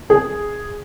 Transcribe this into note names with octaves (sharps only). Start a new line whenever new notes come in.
G#4